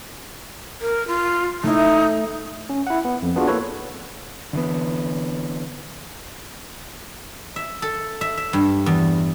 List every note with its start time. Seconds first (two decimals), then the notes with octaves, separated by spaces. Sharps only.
0.81 A#4
1.08 F4
1.63 A3 D#4 E4
2.70 C#4
2.87 E4 F#5
3.05 B3
3.22 F2
3.36 B3 D4 F4 F#4 G#4
3.48 A#3 E4 A4 B4 C#5
4.53 D3 E3 B3
7.56 E5
7.82 A4
8.21 E5
8.37 E5
8.53 G2
8.86 E2